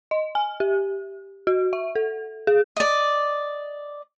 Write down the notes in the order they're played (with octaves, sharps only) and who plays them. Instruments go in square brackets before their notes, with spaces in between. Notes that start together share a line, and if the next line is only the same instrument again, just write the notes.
[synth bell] D#5
G#5
G4
F#4
E5
A4
G#4
[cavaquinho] D5 D#5